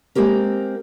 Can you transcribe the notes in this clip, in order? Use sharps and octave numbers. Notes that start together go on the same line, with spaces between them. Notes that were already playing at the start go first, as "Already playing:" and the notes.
G#3 A#3 C4 G4 A#4